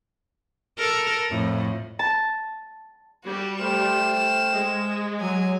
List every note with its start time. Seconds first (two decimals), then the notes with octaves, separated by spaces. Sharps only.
0.78 A4 A#4
1.30 F2 A2
1.99 A5
3.25 G3 F#4
3.61 A3 C5 G5 F6 E7
4.54 G#3
5.21 F#3 G#5